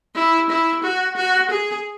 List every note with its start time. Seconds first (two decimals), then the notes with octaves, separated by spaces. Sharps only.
0.15 E4
0.50 E4
0.83 F#4
1.16 F#4
1.50 G#4